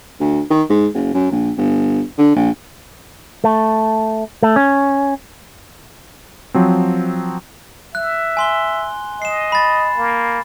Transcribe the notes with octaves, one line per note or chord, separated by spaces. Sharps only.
D2
D#3
G#2
F#1
F#2
A#1
G1
D3
A#1
A3
A3
C#4
F3 F#3 C4
E5 F#6
G#5 C6 G7
D#5 C7 E7
B5 A6
A#3